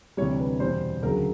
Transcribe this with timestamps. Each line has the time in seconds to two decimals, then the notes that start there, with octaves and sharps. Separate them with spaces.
0.17 D2 C3 E3 G3 C#5
0.40 B4
0.60 E2 B2 G3 C5
1.03 D2 C#3 F#3 A#4